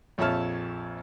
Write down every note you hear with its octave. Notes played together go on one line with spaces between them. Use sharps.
A#1 F2 C#5 E5 A5 F6